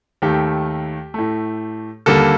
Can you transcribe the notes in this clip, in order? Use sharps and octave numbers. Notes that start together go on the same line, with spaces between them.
D#2 D#3 A3 G4
A2 A3
D#2 D3 G3 A#3 A4